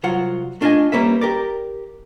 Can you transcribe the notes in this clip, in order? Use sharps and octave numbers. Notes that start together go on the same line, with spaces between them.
C2 F#3 F4 F#5
A3 D4 F4 D5 D#5 G#5
G3 A#3 C#4 B4 E5
G4 A#4 D5